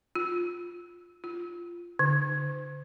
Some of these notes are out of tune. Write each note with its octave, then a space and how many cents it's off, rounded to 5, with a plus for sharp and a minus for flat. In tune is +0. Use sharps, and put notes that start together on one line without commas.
F4 +10
F4 -10
D3 -40